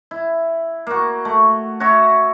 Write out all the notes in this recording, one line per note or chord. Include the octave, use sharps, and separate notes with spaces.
E4
A#3 F#4
A3
F#4 C#5 E5 A#5